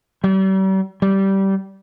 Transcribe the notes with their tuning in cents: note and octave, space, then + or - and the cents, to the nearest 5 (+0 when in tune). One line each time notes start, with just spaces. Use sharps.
G3 -40
G3 -15